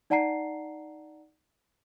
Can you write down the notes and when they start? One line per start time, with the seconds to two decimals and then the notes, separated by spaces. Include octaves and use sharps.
0.10 D#4 D5 F#5 A5 A#5 C7